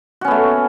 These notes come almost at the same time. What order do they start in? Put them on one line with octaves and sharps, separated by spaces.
F#4 C#4 B3 A3